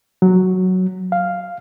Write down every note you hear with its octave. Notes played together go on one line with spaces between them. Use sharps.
F#3
F5